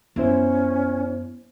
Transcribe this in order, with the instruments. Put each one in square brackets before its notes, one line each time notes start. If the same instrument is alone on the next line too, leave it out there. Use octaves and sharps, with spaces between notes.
[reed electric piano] F#2 E4 C5 [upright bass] B3 [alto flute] C#4